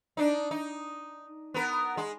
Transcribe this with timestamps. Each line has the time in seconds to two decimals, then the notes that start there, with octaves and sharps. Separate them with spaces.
0.17 D4 D#4
0.51 D#4
1.54 B3 A#4
1.97 G#3